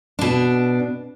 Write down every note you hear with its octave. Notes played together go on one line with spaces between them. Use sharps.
B2 D4